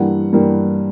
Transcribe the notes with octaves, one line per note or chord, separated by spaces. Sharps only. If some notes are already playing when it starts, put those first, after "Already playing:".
Already playing: G2 E3 G3 A#3 F#5
G2 E3 G3 A#3